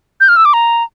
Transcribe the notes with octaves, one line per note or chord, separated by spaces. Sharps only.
G6
F6
E6
D6
A#5